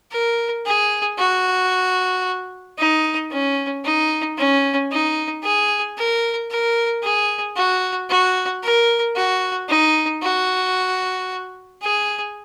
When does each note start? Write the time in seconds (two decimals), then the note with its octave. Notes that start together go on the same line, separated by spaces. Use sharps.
0.12 A#4
0.66 G#4
1.19 F#4
2.78 D#4
3.31 C#4
3.85 D#4
4.37 C#4
4.91 D#4
5.43 G#4
5.97 A#4
6.51 A#4
7.03 G#4
7.56 F#4
8.10 F#4
8.63 A#4
9.16 F#4
9.69 D#4
10.22 F#4
11.82 G#4